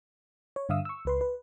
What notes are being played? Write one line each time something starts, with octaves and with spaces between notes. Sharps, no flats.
C#5
G2 D3 E5 F5 D#6 E6
C#6 E6
C#2 B4 C6
B4